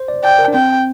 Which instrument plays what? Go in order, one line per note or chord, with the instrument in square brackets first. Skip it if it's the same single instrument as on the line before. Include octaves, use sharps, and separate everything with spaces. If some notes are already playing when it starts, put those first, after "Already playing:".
Already playing: [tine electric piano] C5
D5
[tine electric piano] D5 [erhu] G5
[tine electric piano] A#4
D4
[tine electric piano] C4 [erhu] G5